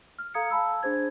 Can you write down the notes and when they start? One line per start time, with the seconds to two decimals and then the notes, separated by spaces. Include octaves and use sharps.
0.19 F6
0.34 A4 F5 A#5 D#6 G#6 C#7
0.50 F5 A5 B5 E6
0.83 D4 G#4 C5 G#6